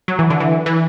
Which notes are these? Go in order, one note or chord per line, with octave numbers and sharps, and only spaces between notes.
F#3
E3
D3
E3
E3